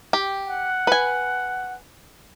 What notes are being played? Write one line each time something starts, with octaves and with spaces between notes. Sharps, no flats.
G4
F#5
B4 G#5